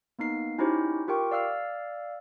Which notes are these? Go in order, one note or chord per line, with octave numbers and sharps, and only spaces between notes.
A#3 B3 D#4 C7
C#4 D#4 E4 F#4 G4 C5
F4 G4 A#4 G5 C#6
D5 F5 E6 F6